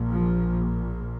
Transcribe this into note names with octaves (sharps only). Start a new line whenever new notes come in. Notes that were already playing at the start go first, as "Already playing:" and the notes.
Already playing: A#1 A#2
F3